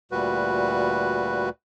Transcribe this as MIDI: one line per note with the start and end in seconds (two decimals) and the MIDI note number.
0.12 1.49 38
0.12 1.49 46
0.12 1.49 55
0.12 1.49 66
0.12 1.49 71